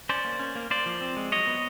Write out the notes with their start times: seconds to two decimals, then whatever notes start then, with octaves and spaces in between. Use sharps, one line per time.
0.09 C#4 C5 D5
0.25 A#3
0.39 C#4
0.55 A#3
0.70 A#3 C5 D5
0.86 F3
1.01 C4
1.17 G#3
1.32 F#3 C#5 D#5
1.47 B3